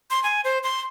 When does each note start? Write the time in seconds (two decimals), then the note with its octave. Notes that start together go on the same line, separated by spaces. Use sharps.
0.10 C6
0.23 G#5
0.44 C5
0.63 C6